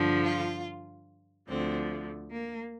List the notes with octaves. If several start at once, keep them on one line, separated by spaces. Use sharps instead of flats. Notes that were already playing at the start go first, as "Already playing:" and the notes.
Already playing: G2 D3 F3
F4
D2 D3 F3 C4
A#3